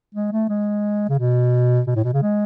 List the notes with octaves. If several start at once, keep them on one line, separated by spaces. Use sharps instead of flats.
G#3
A3
G#3
C#3
B2
B2
A2
B2
C#3
G#3